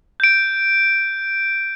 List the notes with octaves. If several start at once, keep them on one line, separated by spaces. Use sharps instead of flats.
G6 D7